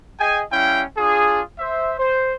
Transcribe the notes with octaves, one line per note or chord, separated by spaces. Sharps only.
G#4 D#5 G5 G#5
G3 C#4 E4 F5 G5
D4 F4 G#4
C5 E5
C5